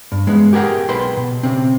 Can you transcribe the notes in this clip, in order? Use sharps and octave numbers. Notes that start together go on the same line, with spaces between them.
G2
G#3 B3
G4 G#4 A#4 F#5 G5
B1 B4 G5 C6
B2
C#3 C4